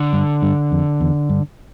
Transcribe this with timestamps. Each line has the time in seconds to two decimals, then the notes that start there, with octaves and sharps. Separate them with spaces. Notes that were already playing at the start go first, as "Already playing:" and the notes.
Already playing: D3
0.13 G2
0.42 G2
0.72 F2
1.00 E2
1.30 G2